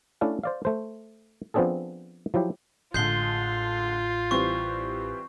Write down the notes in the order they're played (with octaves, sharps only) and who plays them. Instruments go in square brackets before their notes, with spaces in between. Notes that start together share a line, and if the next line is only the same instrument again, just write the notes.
[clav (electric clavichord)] A3 C#4 D4 E4 A4 F5
C5 D5 F5
A3 C5
F3 B3 C4 D4 G#4 A4
F3 F#3 E4 G4
[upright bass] A1 [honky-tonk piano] D3 G#3 [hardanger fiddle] F4 [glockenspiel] G6 C7 G7
[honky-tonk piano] E3 G3 C4 [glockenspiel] C#6